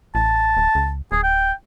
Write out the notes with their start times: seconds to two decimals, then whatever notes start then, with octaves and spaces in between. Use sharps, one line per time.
0.15 A1 A5
0.57 D1
0.75 C#2
1.12 D1 G#4
1.24 G5